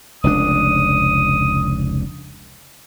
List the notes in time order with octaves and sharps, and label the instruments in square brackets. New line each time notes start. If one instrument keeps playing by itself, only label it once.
[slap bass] F1 C#2 D4 [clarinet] D#6